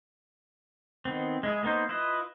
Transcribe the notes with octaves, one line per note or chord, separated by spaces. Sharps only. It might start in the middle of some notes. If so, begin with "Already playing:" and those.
D#3 B3 C4
G#3 E4 G#4
A#3 B3 D#4 C5
E4 F4 B4 D#5